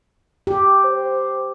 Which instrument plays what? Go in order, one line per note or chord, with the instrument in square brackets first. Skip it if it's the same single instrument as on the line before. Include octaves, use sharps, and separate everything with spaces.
[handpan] G4
[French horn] C5